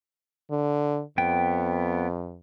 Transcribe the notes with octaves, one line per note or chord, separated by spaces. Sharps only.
D3
F2 B3 G5